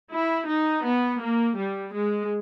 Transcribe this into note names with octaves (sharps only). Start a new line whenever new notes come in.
E4
D#4
B3
A#3
G3
G#3